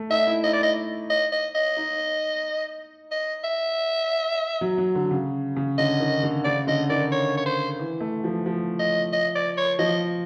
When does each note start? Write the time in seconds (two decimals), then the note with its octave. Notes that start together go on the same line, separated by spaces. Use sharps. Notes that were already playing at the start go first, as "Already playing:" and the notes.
Already playing: A3
0.10 D#4 E5
0.27 E4
0.44 D#4 D#5
0.53 D5
0.63 D#5
1.10 D#5
1.32 D#5
1.55 D#5
1.77 D#4
3.11 D#5
3.44 E5
4.61 F#3
4.78 F#3
4.95 D3
5.11 C#3
5.56 C#3
5.78 D3 D#5
6.00 D#3
6.23 D3
6.45 C#3 D5
6.67 D3 D#5
6.90 D#3 D5
7.12 C#5
7.37 C#5
7.46 C5
7.79 E3
8.01 A3
8.24 F3
8.46 F3
8.79 D#5
9.12 D#5
9.35 D5
9.57 C#5
9.79 F3 D#5